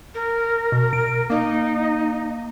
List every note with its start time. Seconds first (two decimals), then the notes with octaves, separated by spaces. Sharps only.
0.15 A#4
0.72 B2
0.93 D7
1.30 A#3 D#4